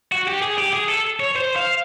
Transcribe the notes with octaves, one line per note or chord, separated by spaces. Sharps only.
F#4
G4
G#4
G4
G#4
A4
C#5
C5
F5